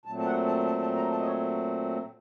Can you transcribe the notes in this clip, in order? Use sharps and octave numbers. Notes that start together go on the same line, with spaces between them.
A#2 F#3 A3 C4 A5
A5
F#5
A5
A5
A5
A#5
A5
D#5
C#5